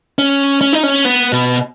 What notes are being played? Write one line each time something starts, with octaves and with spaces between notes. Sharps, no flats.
C#4
C#4
D#4
C#4
B3
B2